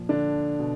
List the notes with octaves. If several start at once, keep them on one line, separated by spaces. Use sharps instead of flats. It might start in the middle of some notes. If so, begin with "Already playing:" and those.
Already playing: A#2 F3
D3 D4
B2